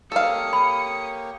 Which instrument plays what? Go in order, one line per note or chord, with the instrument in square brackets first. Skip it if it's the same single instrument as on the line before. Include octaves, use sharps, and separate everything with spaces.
[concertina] A#3 G4 C#5 [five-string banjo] A4 F5 [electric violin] D#6 C#7
[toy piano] B5